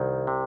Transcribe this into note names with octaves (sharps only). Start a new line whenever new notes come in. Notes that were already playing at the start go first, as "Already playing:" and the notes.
Already playing: C2 D#3
C3